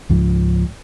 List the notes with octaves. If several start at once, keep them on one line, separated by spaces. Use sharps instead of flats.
C#2 G#2 F3